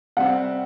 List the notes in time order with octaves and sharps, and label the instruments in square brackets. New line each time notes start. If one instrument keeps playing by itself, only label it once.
[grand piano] C3 G3 C4 [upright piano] F#5